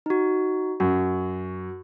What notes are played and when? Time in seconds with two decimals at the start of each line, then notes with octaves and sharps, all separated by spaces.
0.06 D#4 F#4
0.80 F#2 F#4